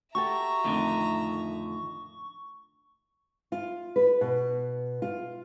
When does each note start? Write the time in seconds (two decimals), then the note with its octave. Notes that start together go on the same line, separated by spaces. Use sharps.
0.15 F#4 G4 A4 E5 A#5 C#6
0.64 F2 A2 D3 D#3
3.52 F4
3.96 B4
4.21 B2
5.02 F4